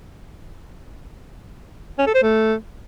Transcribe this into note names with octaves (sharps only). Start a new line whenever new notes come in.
C#4
A4
C5
A3